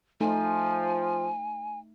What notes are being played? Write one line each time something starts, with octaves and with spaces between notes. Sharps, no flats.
F3 A3 D#4 G#5